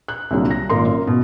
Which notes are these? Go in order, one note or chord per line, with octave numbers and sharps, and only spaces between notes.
F#6
C2 A#2 D3 F#3 G3
A#6
G#1 A#2 A#4 C6
F#2
B2